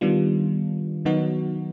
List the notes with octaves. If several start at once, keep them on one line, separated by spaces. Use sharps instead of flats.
D#3 G3 B3 D4 F4
D#3 F#3 B3 D#4 F#4